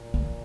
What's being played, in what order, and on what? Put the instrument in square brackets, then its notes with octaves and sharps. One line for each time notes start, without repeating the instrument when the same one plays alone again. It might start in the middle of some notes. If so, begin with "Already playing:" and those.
Already playing: [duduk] A#2
[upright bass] C#3